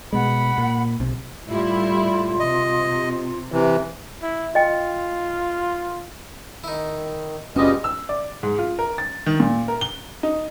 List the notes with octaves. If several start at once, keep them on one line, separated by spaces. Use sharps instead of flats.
B2 G#3 F#5 B5
A#2
B1 C3
A2 G3 E4 F4
C3 D#5
C3 E3
E4
F4 D#5 G5
D#3 D#4 E4
F#1 B2 G3 G#3 C#4 F4 G4 D#5
E6
D5
G#2
F4
A#4
A6
D#3
A#2
A#4
G7
D#4